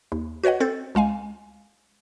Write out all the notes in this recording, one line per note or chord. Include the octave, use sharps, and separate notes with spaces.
D#2
F#4 B4 C#5 D#5 F#5
C4 A4 C5 G6 A6
C#2 G#3 F5 G#5